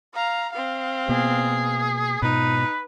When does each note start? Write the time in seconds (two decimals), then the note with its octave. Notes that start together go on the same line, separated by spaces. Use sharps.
0.14 F5 A#5
0.52 C4 F5
1.09 B2 A#3 B3 G#4
2.22 G#2 B2 D#4 B4